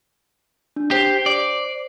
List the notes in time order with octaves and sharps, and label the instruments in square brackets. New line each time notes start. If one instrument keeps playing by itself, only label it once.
[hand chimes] D4
[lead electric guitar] G4 [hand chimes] C5 C7
[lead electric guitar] D5